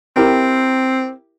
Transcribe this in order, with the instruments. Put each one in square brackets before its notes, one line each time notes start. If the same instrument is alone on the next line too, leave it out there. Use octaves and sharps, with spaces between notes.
[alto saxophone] C4 [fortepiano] E4 G4 A#4